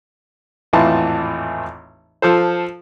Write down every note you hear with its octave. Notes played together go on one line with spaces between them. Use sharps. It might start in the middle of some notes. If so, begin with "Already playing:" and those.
G#1 E2 A2 E3 F4 A5
F3 A4 C5